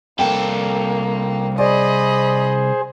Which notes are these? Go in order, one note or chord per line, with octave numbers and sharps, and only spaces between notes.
C2 A#3 A4 G5
G#4 C5 D5 D#5 B5